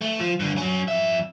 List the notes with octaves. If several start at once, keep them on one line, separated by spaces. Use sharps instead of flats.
A3
F3
G2 D3
F#3 C#4
F2 E5